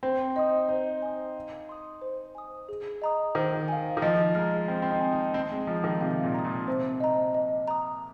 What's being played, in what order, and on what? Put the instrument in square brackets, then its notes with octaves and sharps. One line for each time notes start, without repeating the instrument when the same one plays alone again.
[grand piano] C4 [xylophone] C5
[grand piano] D#4 [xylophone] D#5 C6 D#6
[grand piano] D#4 [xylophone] C5
[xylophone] G#5 C6 D#6
F5
C6 D#6
C5
G#5 D#6
G#4
D#5 A#5 D#6
[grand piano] D#3 [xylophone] C5
[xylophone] F5 G#5
[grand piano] D#3
[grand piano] F3 [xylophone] D#5
[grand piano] G#3 [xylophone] A#5 F6
[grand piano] C4 [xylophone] C5
[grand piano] C4
D#4
[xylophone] G#5 D#6
[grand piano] D#4
[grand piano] C4 [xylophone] D#5
[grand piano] G#3
[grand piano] F3 [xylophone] A#5 D#6
[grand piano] D#3
[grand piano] C3 [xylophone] F5
[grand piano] A#2
[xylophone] A#5 D#6
[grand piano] A#2
[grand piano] C3 [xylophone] C5
[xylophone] D#5 A#5
D#5
A#5 D#6